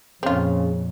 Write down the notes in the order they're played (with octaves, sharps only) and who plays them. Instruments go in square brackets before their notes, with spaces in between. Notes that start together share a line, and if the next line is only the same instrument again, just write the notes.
[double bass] F2 A#2 [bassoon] C#3 [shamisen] C4 F4